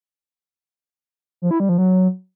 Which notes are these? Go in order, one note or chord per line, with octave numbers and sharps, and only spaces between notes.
F3
E4
G3
F3
F#3